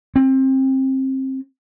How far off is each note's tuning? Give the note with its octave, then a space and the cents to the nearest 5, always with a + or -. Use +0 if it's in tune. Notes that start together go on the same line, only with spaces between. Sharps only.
C4 +25